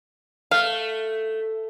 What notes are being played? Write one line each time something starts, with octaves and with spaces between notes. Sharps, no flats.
A3 F5